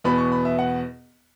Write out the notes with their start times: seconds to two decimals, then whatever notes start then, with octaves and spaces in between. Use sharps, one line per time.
0.04 E2 B2 B3 B5
0.18 C#6
0.32 B5
0.45 E5
0.59 F#5